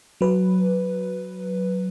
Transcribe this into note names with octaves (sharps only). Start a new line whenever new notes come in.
F#3 B4